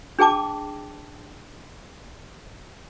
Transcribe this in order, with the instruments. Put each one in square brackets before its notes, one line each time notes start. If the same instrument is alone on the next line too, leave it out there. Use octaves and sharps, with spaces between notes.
[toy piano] D4 G#4 G5 A5 D6